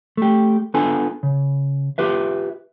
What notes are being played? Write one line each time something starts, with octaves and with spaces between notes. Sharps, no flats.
A3 G4
B3 D4 F4 A4 G#5
C#3
F4 G4 B4 E5